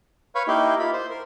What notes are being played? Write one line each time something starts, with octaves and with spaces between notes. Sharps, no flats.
B4 C#5 F5 B5 C#6
A#3 D#4 E4 G4
F4 B5
C5
A#4